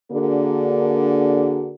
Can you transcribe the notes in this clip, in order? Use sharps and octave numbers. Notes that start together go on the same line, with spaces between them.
D3 A#3 D4 F#4 G#4 A#4